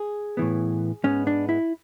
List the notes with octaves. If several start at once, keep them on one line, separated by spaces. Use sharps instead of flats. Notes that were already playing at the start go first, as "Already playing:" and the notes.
Already playing: G#4
A2 E3 B3
G#2 G#3 B3 C#4
D4
E4